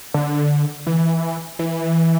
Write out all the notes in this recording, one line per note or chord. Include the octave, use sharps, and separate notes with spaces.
D3
E3
E3